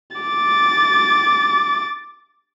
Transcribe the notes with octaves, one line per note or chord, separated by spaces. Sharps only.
D6 A6